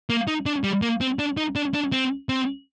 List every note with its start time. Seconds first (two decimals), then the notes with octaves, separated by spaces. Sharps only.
0.10 A#3
0.28 D#4
0.46 D4
0.64 G3
0.82 A#3
1.01 C4
1.19 D4
1.37 D#4
1.56 D4
1.74 D4
1.92 C4
2.29 C4